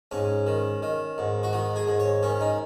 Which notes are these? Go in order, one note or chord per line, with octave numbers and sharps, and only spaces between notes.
G#2 C#4
D#3
D#3
G#2
F#4
D#3 D#4
G#4
G#2
C#5
D#3 C#4
D#4